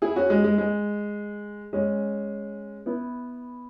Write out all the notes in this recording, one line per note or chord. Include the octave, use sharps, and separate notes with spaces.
E4 G#4
C#4 F#4
G#3
G#3
G#3
G#3 C#4
B3 E4